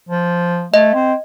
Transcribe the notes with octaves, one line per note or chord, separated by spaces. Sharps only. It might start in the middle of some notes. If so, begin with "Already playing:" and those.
F3
A3 D#5
C4